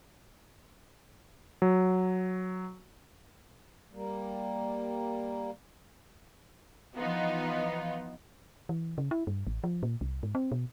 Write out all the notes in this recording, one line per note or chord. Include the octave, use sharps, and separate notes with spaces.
F#3
G3 A#3
E3 F3 B3 D#4 F4
E3
C#3
E4
G2
A1
F3
A#2
C2
G#2
C4
B2